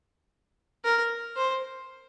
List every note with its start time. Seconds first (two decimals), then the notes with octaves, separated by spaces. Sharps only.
0.84 A#4
1.36 C5